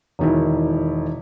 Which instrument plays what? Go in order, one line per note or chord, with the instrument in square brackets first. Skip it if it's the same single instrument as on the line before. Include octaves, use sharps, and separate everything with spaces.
[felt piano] E1 D#3 E4